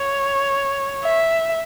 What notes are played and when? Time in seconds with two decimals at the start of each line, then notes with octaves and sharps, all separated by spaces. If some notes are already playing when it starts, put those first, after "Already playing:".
Already playing: C#5
1.04 E5